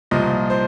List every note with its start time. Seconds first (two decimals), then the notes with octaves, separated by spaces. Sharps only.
0.11 C2 A#2 F3 D#5
0.50 C5